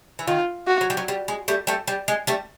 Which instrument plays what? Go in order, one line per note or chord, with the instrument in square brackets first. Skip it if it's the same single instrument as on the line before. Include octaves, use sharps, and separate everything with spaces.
[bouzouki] E3
[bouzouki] D#3 [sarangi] F4
[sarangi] F#4
[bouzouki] F#3
G3
F#3
G3
G#3
G3 A3
G3 A3
G3
G#3
G3 A3